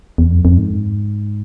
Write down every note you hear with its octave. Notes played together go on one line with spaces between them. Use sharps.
E2
F2
F2
G#2